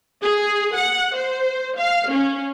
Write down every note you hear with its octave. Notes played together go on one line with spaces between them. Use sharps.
G#4
F#5
C5
F5
C#4